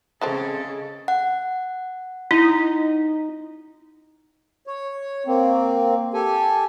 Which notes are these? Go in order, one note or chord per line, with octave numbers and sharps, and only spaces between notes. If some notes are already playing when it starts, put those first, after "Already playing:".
C#3 G#3 A3 C4 G#4 A4 D#5
F#5
D#4 E4
C#5
A#3 C4
G4 A4 G#5